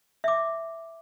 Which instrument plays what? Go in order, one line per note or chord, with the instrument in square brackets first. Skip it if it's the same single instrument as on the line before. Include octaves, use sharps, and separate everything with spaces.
[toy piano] E5 D6